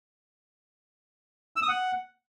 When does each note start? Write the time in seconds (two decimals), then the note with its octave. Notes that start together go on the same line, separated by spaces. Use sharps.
1.56 E6
1.62 D#6
1.68 F#5